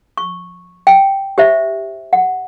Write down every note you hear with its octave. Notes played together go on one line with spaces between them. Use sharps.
C#6
G5
G4 C5 E5
F#5